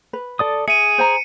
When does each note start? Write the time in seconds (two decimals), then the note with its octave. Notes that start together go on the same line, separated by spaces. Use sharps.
0.13 B4
0.39 A4 D5 D#6
0.68 G#4 E5 C#7 D#7
0.98 C5 G#5 A#5